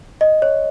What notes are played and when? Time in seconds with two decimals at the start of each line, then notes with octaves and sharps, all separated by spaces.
0.21 D#5
0.42 C#5